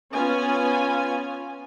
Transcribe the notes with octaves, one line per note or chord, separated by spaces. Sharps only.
B3 C#4 F4 G#5